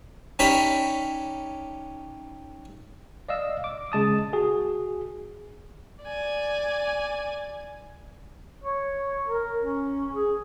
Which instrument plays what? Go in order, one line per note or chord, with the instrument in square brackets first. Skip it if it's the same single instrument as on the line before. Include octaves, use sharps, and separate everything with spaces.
[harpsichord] C#4 D#4 G4 D5 A5 B5
[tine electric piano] D5 D#5 F5 E6
D6
C#3 G#3 A5 D#6
F#4 G#4
[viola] D5 G#5
[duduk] C#5
A#4
C#4
G#4